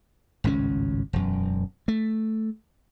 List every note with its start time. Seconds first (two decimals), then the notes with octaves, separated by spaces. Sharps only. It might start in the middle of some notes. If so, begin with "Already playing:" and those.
0.44 G#1 C#2 A2 C#4
1.13 E1 F#2
1.88 A3